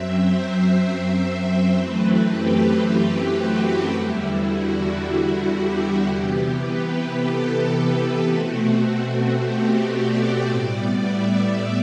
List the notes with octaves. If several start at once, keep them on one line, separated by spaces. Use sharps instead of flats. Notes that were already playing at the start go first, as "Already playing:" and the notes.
Already playing: F#2 F#3 C4 E5
C5
F#2 E3 A3 C4 B4
G4
F#4
E2 D3 G3 E4
F#4
G4
C3 E3 B3
B4
A4
B2 A3 C4 F#4
G4
D5
A2 G3 B3
E5